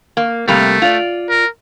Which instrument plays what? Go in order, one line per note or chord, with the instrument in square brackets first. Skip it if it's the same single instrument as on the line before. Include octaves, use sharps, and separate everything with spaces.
[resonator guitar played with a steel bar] A#3
[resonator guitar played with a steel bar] C3 G3 A#3 [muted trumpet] A3
[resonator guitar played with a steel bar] F4 D5
[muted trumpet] A#4